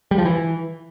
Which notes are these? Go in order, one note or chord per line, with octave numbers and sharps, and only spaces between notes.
G3
F3
E3